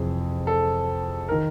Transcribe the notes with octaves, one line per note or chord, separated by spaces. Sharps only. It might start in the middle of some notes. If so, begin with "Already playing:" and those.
Already playing: F2 C3 E3 G#4
A4
A#4
D#3